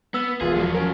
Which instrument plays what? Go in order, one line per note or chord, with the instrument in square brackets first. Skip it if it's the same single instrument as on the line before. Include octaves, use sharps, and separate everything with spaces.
[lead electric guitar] B3 [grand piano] E6
[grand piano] E1 F4 [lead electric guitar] G#4
[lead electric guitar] F3 F#3
[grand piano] C#4 A#4